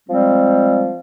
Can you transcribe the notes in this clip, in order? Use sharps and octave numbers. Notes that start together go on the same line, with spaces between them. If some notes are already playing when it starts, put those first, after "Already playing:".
F3 G3 G#3 C4